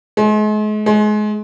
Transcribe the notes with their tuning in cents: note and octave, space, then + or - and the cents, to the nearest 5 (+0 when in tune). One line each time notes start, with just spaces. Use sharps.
G#3 +40
G#3 +30